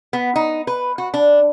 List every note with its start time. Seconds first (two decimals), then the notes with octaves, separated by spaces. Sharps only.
0.13 B3
0.36 D#4
0.67 B4
0.98 F#4
1.14 D4